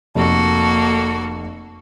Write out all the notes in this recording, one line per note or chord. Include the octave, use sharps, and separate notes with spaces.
F1 A#3 F#4 A4